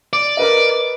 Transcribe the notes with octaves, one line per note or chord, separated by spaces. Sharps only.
D5
A#4 B4 D#5